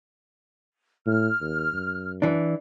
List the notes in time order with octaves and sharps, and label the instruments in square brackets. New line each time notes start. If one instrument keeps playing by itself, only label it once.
[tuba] A2 [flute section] F6
[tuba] D#2
F#2
[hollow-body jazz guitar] E3 D4